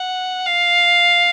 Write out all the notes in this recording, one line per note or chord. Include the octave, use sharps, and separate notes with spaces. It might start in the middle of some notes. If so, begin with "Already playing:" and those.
Already playing: F#5
F5